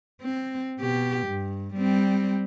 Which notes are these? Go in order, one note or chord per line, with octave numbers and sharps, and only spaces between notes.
C4
B2 G4
G2
G3 C4